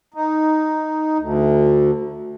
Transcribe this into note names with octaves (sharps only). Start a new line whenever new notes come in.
D#4
D2